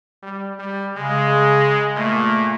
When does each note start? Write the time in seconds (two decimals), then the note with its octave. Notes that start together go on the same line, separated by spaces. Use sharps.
0.23 G3
0.59 G3
0.97 C#3 G#3
1.96 A#2 A3